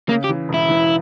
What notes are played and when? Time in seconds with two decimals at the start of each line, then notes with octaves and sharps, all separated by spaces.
0.09 C#3 A#3
0.24 G4
0.29 E3
0.49 E1
0.54 E4
0.69 E3